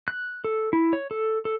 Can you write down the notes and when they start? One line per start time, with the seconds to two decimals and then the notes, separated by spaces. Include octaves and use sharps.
0.08 F#6
0.44 A4
0.73 E4
0.93 C#5
1.11 A4
1.45 A4